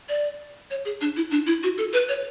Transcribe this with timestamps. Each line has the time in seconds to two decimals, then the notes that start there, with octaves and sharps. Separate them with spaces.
0.09 D5
0.71 C#5
0.85 G#4
1.01 D4
1.17 E4
1.31 D4
1.47 E4
1.63 F#4
1.78 A4
1.93 B4
2.09 C#5